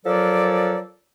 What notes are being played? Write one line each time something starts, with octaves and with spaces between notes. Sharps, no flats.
F3 F#3 A4 A#4 D5